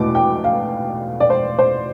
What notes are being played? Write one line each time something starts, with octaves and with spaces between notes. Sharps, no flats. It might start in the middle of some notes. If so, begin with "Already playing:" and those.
Already playing: E2 B2 A3 D6
G5
F5
D5
C5
C5